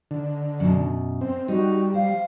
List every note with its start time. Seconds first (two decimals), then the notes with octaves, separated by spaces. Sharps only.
0.11 D3
0.60 F#2 B2
1.21 C4
1.48 G3 D#4 F#4
1.94 C5 F5